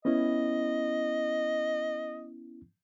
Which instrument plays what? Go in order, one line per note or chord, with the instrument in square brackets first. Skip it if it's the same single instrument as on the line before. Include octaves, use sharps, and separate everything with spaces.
[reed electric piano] B3 C#4 E4 [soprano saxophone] D#5